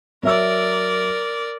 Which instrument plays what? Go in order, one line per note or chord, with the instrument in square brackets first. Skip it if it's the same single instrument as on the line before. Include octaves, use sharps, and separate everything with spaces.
[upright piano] F#3 E5 E6 [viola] A#4 D5